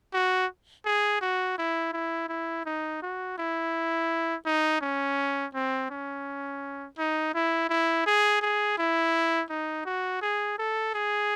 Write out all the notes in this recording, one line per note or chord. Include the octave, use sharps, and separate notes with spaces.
F#4
G#4
F#4
E4
E4
E4
D#4
F#4
E4
D#4
C#4
C4
C#4
D#4
E4
E4
G#4
G#4
E4
D#4
F#4
G#4
A4
G#4